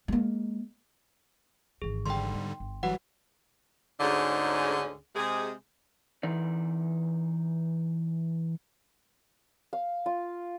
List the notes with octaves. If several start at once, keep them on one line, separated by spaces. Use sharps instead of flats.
G#3 A#3
G#1 E3 G#4
G#2 D3 G3 G5 C6
B3 D#4
G1
E3 F#3 G3 F#4 B4 F#5
D2 G#2 D3 C#4 D#4 G#4
C3 G#3 G#4
E3 D#4 D5
F5
F4